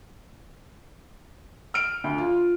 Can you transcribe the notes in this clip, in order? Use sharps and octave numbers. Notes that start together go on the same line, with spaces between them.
F6 D7
D2
F4